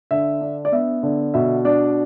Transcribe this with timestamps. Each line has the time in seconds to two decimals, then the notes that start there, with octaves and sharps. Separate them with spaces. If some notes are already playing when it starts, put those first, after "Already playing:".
0.11 D3 E5
0.41 D4
0.65 D5
0.72 B3 E5
1.03 D3
1.34 B2 E5
1.65 D4 D5